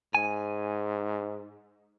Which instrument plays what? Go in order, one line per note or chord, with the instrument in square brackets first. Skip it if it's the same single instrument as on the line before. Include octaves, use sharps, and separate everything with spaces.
[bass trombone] G#2 [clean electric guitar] G#5